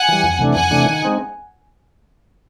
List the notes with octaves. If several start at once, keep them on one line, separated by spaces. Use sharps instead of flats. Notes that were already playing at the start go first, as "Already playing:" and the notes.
Already playing: F#5 G#5
E3 G3
F2
C3 E3 A3 D4
F2 F#5 G#5
C3 E3 A3 D4
D#3
G#3 C4 D#4